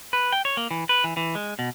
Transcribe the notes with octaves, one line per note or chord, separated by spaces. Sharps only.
B4
G5
C#5
A#3
E3
B4
E3
E3
G#3
B2